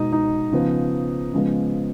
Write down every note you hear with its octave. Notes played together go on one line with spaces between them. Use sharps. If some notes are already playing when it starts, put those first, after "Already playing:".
Already playing: B2 G#3 B3 D#4
D#4
C#3 F3 B3
C#3 F3 G#3 B3